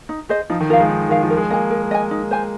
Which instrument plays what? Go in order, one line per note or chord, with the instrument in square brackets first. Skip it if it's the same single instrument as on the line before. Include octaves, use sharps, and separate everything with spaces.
[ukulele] D#4
G#4 C5 D#5
[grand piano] F3 [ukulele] D#4
[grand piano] D#3
[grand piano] F3 [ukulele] A#4 F5
[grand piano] G#3
[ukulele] D#4
[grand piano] D#3 [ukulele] A#4 F5
[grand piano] F3
[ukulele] A#4
[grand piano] G#3
[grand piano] A#3 [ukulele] D#5 G#5
[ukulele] A#4
D#5 G#5
D#4
C5 G#5